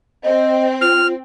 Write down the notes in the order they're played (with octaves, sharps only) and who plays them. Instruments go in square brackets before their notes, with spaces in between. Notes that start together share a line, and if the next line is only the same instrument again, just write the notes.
[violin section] C4 [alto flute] D#5
[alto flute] F4 [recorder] F6